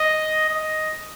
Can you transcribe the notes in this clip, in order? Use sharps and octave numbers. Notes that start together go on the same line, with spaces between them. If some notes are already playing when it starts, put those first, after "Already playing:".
Already playing: D#5
D#5